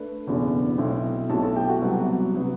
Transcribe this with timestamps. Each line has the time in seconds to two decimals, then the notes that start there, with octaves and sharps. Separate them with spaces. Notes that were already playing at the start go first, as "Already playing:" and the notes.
Already playing: A3 D4 B4
0.27 F#1 E2 B2 A3 D4
0.78 B1 B2 A3 C4 E4
1.29 B1 B2 A3 C4 E4 A4 A5
1.43 A4 A5
1.56 G4 G5
1.69 F#4 F#5
1.82 C2 C3 F#3 B3
2.34 C3 F#3 B3